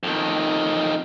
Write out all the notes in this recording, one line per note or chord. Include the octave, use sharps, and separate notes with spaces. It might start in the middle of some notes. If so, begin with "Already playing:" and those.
F2 D#3